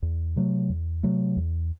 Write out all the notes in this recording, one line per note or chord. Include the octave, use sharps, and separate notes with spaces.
E2
C3 F#3 A3
E2
C3 F#3 A3
E2